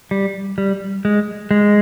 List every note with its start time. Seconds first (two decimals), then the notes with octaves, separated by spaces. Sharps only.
0.11 G3
0.58 G3
1.05 G#3
1.51 G#3